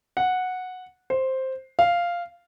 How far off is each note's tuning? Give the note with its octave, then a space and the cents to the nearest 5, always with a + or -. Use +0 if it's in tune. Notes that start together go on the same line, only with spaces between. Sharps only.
F#5 -10
C5 +5
F5 -5